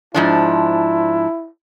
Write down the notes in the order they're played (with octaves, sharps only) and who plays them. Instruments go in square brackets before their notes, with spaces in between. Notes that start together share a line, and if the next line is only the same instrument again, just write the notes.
[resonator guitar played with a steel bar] G#2 F3 D4 [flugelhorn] E4